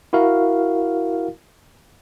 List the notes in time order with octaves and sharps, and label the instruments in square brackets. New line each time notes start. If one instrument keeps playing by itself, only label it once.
[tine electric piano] E4 F#4 A#4 F5